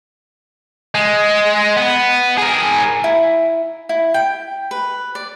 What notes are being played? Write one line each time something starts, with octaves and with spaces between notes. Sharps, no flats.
G#3
B3
G#4 A#4
E4
E4
G5
B4
D5